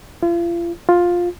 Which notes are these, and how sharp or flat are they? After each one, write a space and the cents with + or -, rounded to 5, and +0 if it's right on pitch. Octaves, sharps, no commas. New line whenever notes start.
F4 -40
F4 +10